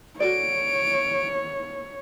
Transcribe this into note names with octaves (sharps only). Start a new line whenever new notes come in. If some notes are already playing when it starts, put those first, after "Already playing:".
F#4 A4 C#5 D5 D7